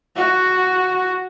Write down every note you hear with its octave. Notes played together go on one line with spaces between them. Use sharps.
F#4